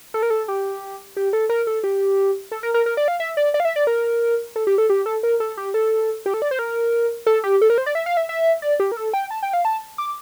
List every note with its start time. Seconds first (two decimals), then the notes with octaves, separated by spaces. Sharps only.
0.14 A4
0.23 A#4
0.30 A4
0.48 G4
1.17 G4
1.33 A4
1.50 A#4
1.67 A4
1.84 G4
2.52 A4
2.63 A#4
2.74 A#4
2.86 A#4
2.97 D5
3.08 F5
3.20 E5
3.37 D5
3.54 D5
3.60 F5
3.65 E5
3.76 D5
3.87 A#4
4.56 A4
4.67 G4
4.78 A4
4.90 G4
5.06 A4
5.23 A#4
5.40 A4
5.57 G4
5.74 A4
6.26 G4
6.34 A4
6.42 D5
6.51 C5
6.59 A#4
7.27 A4
7.44 G4
7.62 A4
7.70 A#4
7.78 C5
7.86 D5
7.95 E5
8.06 F5
8.17 E5
8.29 E5
8.62 D5
8.80 G4
8.92 A#4
8.97 A4
9.14 G5
9.31 A5
9.43 G5
9.53 F5
9.65 A5
9.98 D6